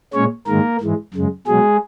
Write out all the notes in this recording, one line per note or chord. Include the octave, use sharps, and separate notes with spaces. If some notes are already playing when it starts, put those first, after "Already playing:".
A#2 G#3 C#4 C#5
G#2 D#3 G#3 A#3 A#4
G#2 E3 G#3
F#2 C#3 G#3
B2 F#3 G#3 G#4